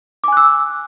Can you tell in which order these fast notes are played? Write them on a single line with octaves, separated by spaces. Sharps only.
D6 G#5 F#6 E6